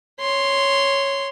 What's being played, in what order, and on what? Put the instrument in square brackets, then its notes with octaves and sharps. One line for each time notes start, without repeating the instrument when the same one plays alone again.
[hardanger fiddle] C#5 C6